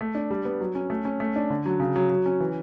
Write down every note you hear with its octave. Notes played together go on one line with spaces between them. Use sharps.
A3
D4
G3
B3
F#3
C#4
A3
C#4
A3
D4
D3
F#3
C#3
F#3
F#3
C#4
E3